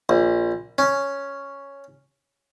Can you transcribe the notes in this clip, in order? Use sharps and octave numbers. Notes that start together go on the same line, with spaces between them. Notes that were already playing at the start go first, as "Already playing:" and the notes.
A#1
C#4